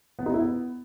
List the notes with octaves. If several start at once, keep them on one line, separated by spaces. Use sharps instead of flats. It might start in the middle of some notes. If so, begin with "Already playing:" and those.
B3
D#4
E4
B3